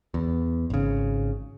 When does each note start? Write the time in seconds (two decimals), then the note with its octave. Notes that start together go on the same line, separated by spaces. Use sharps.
0.14 E2
0.70 G#1 C#3